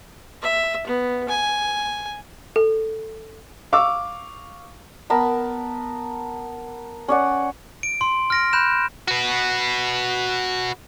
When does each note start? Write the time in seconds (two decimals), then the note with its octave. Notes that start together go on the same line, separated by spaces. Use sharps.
0.43 E5
0.87 B3
1.28 G#5
2.56 A4
3.73 F5 C#6 D6 E6
5.10 B3 A#4 A5 B5
7.08 C#4 D5 F#5
7.83 D7
8.01 C6
8.30 F6 A#6 D7
8.53 B5 F#6 G6 E7
9.08 F#4 B4